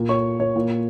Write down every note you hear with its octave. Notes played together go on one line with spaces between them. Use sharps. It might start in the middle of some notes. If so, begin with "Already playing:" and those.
Already playing: A#2
C#5 C#6
C#5
A#2